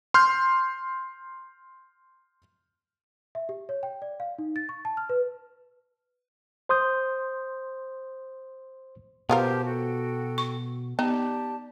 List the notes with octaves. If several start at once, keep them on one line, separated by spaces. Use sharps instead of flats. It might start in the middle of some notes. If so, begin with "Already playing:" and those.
C6 F6 G6
E5
G4
C#5
G5
D5
F5
D#4
A6
C#6
A5
F6
B4
C5 C6 D#6 G6
B2 B3 F4 G4 A#4 C5 A5
F#4 A4 G5
C#6
B3 D#4 G4 D5 A5